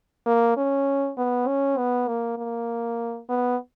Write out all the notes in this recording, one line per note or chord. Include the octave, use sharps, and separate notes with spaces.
A#3
C#4
B3
C#4
B3
A#3
A#3
B3